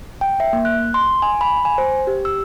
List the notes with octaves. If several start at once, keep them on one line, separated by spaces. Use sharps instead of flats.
G5
E5
A#3
F#6
C6
G#5
B5
G#5
C5
G4
E6